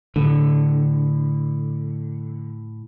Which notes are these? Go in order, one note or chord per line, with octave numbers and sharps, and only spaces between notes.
A2 D3